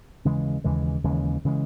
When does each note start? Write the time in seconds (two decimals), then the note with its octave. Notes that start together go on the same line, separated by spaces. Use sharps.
0.25 D#2 C#3 E3 G#3
0.64 D#2 C#3 E3 G#3
1.04 D#2 C#3 E3 G#3
1.45 C#3 E3 G#3